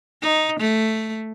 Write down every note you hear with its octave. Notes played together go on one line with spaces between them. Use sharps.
D#4
A3